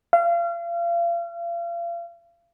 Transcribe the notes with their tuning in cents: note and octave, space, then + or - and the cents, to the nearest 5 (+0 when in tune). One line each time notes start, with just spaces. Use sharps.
F5 -35